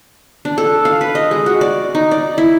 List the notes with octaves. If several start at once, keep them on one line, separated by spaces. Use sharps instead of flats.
D4
A4
F5
B4
D#5
G#3
F#4
D5
D#4
D5
E4